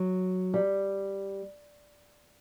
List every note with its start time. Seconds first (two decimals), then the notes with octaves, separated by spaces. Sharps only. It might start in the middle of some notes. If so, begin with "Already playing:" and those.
Already playing: F#3
0.54 G3